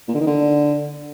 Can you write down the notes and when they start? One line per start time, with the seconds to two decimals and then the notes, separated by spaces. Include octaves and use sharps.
0.08 A#2
0.14 D3
0.20 D#3
0.27 D3